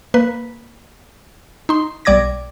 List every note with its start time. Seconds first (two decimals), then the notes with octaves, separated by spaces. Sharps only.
0.14 A#3 B4
1.69 D#4 C6
2.05 B1 G3 D5 D6 G#6 A#6